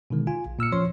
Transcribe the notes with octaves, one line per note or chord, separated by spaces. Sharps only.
B2 D3 D#3 G#3
F4 G#5
A#1
A#2 E6 F6 C#7
F3 C#4 C#5 C6